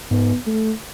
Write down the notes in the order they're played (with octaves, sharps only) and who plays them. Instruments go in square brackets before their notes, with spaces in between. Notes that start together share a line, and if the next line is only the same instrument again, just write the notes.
[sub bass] G#2 [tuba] B3
[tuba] A3